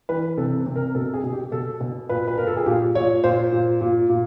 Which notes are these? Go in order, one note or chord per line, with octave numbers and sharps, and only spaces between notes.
E3 B4
C3 A4
C3
A#4
B2 A4
G#4
B2
G4
B2 A4
B2
A#2 B4
B4
A#2 A#4
A4
G#4
A#2 G4
A#2 C#5
A#2 C5
A#2
A#2
A#2